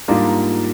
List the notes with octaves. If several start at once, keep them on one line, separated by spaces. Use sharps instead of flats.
G#2 G3 A#3 D4 F4